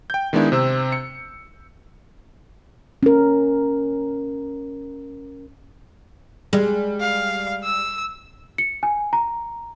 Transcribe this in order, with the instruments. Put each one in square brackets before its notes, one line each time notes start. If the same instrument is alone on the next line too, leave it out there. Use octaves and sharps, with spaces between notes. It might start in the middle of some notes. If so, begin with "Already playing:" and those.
[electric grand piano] G5 G6
D#3 G#3 B3 D4 E4
C3 C4 E6
C#7
[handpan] C#4 A#4
[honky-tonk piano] G3 [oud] G#3
[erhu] F5
E6
[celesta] C#7
G#5
A#5